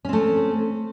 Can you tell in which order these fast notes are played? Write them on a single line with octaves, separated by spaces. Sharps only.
C#4 C4 A3